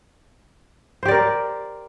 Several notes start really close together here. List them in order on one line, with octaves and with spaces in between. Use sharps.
C5 G4 D5 A#4